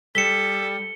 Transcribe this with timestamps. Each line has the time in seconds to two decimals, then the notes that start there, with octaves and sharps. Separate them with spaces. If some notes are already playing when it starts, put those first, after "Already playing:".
0.15 G3 A4 B6 C#7 E7 G7